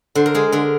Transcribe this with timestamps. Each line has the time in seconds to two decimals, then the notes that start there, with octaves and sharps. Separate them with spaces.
0.15 D3 C5
0.26 A#4
0.35 G#3 G#4
0.52 D3 A#4